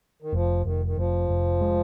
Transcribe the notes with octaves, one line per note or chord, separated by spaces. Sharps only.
D#3
F1 F3
F1 D#3
D#3
F1 F3
F1
G#3